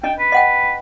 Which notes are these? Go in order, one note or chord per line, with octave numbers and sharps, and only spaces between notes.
C#4 D4 D#5 G5
B4
D#5 F#5 G5